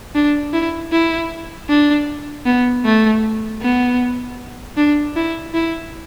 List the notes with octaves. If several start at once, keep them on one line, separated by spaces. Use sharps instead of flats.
D4
E4
E4
D4
B3
A3
B3
D4
E4
E4